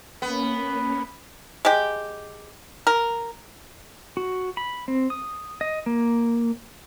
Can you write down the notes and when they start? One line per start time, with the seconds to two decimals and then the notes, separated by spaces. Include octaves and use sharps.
0.22 A#3 B3 C#4
1.65 G#3 G4
2.87 A#4
4.17 F#4
4.57 B5
4.88 C4
5.10 D#6
5.61 D#5
5.86 A#3